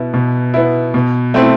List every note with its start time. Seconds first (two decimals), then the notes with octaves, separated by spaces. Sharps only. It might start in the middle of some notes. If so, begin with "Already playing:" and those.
Already playing: B2 B3 E4
0.14 B2
0.54 B3 E4
0.94 B2
1.34 A3 C4 E4